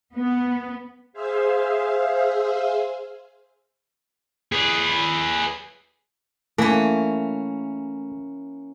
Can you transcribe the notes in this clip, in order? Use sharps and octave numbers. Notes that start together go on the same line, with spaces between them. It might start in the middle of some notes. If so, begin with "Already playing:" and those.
B3
G#4 C5 E5 F5
G#4 B4
E3 A3 A#3 C#4 G#5